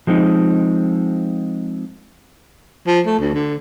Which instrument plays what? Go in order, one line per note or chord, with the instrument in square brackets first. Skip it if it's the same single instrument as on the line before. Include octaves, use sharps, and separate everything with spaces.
[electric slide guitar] F3 G#3 C4 D#4
[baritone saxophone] F3
A3
D2
D3